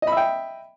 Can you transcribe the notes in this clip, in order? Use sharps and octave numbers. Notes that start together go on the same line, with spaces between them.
D#5 E5 G5 B5